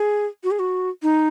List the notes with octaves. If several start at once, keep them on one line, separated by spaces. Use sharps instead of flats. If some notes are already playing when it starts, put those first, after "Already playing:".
Already playing: G#4
F#4
G#4
F#4
D#4